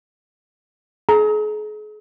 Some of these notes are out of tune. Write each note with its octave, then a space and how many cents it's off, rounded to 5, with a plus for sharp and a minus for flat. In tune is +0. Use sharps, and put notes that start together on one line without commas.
G#4 +40 A#5 +0